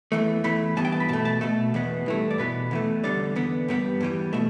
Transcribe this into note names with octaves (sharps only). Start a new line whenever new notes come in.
E2 E3 A3
E2 E3 A3 B5
G2 E3 B3 A5
G5
A5
B5
B2 A3 A5
A5
B2 A3 A4
E2 B2 B3
G2 E3 A3
D5
E2 B2 B3 B4
E2 E3 A3
E2 D3 G3 D5
E2 D3 B3
G2 G3 B3
E2 E3 G3
B2 A3 E5